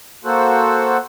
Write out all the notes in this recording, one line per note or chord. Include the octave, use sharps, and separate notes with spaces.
A#3 F#4 A4 C5 F#5